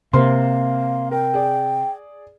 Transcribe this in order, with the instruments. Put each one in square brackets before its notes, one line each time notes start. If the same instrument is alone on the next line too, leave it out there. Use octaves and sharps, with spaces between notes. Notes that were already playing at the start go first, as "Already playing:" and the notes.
[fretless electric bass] C3 [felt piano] A#3 C5 C6 [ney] F5
[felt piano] A#4 [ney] G5
[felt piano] G#4 D5